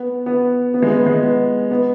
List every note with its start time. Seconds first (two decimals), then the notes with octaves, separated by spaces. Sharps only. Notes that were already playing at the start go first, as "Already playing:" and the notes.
Already playing: B3
0.26 B3
0.74 B3
0.82 G#3
0.91 B3
1.06 G#3
1.23 B3
1.71 B3